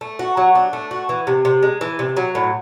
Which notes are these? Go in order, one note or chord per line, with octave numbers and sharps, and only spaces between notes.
A3
F#4
F#3
D4
A3
F#4
E3
C3
C3
G#3
E3
C3
F#3
A2